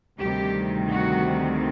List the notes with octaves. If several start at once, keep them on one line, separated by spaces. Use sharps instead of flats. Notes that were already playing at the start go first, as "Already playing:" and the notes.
D2 C3 D#3 G3 G4
F#4